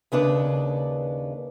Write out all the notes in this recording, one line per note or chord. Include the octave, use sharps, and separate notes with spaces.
D#2 C#3 D4 B4